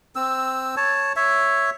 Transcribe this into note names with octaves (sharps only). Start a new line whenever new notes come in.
C4 E6
C#5 A5
C#5 E5